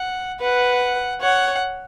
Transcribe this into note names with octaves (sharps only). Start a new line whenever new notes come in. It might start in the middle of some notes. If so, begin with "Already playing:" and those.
Already playing: F#5
B4 F#5
C#5 F#5